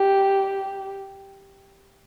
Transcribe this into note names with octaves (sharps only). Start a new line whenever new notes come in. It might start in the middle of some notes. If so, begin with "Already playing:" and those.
Already playing: G4